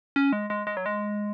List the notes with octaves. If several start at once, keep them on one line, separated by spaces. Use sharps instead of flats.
C#4
G#3
G#3
G#3
F#3
G#3